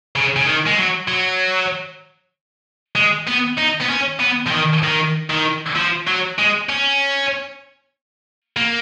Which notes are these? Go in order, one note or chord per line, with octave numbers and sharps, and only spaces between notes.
C#3
C#3
D#3
G#3
F#3
F#3
G#3
B3
D#4
B3
C#4
B3
F3
D#3
D#3
D#3
F3
F#3
G#3
C#4
A#3